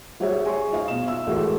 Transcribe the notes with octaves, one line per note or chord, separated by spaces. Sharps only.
G3 F#4 G#4 C5 C#5 E5
G#4 G#5 C6 C#6
D#4 F4 C5 D#5 F5
B2 E7
E5 E6
A1 G#3 A3 F#4 A#4